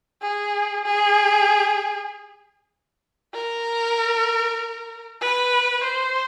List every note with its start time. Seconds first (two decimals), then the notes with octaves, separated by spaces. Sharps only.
0.22 G#4
0.85 G#4
3.34 A#4
5.22 B4
5.84 C5